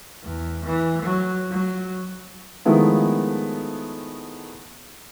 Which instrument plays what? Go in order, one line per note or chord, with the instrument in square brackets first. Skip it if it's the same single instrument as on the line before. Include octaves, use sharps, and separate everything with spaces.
[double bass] E2
E3
F#3
F#3
[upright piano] D#3 F3 G#3 A3 B3 E4